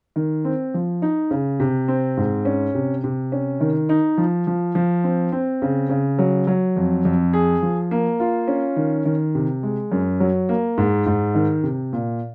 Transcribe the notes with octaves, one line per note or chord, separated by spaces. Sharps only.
D#3
C4
F3
D#4
C#3
C3
C4
G#2
C#4
C3
C3
C#4
D#3
D#4
F3
F3
F3
C4
C4
C#3
C#3
F#3
F#3
F2
F2
G#4
F3
A#3
F4
C#4
D#3
D#3
C3
G#3
F#2
F#3
A#3
G#2
G#2
D#3
C3
A#2